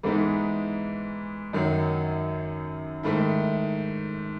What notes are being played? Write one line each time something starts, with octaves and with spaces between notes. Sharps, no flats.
G#2 E3 G#3 B3 D#4
F#2 D#3 F#3
G#2 D#3 A3 E4